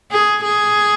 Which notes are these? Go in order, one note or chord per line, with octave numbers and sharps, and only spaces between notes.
G#4
G#4